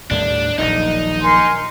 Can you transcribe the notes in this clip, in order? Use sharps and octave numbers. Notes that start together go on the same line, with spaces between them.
D#2 A2 G3 D4
D#1 A#1 F#3 D#4
A#4 G#5 C6